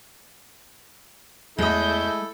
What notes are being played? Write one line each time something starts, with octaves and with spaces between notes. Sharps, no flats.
E2 G#3 A3 E4 A4 D#5 G6